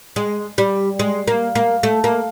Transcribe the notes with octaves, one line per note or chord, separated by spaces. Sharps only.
G#3
G3
G#3
A#3
A#3
A3
A#3